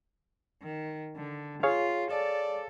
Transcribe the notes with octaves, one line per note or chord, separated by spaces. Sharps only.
D#3
D3
F4 G#4 C#5 F5
A4 D5